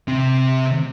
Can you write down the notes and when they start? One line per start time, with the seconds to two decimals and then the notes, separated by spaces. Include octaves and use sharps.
0.08 C3 C4